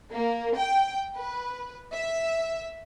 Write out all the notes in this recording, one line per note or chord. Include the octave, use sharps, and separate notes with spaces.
A#3
G5
B4
E5